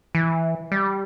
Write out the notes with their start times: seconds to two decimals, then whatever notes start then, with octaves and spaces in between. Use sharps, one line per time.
0.15 E3
0.72 G3